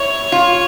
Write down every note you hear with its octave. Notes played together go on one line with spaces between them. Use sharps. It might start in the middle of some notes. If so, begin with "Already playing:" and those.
Already playing: E4 C#5
F4